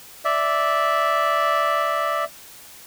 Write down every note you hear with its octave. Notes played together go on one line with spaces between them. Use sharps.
D5 E5